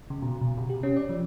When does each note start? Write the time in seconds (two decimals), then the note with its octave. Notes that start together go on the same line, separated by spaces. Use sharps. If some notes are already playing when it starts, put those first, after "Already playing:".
0.10 C#3
0.22 B2
0.41 B2
0.58 C3
0.69 G4
0.83 C#4
0.96 D5
1.09 F3